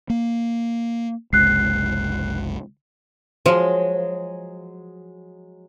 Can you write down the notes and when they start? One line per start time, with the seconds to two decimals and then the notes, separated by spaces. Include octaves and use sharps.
0.10 A#3
1.33 F#1 C2 G#3 F#6 C7
3.46 F3 F#3 G#3